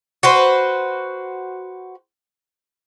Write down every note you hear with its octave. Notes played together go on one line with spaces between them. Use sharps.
F#4 B4 C5